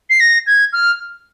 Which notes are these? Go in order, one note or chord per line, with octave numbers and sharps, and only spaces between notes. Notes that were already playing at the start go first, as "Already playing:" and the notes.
C7
A#6
G#6
F6